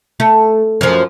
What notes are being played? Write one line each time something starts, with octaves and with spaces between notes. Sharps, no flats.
A3
F#2 F3